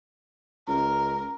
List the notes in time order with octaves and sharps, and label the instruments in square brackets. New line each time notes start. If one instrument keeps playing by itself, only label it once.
[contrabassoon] C#2 [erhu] A#4